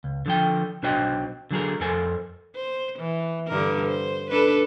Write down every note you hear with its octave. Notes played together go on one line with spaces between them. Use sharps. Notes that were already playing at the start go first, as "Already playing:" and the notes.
C#2
D3 F3 G5
B1 D4 F#4 C5 D#5 G5
D3 F#3 G#4 A#4
F2 A4 A#4 C5 G#5
C5
E3
G2 D3 A#4
C5
D4 A4 B4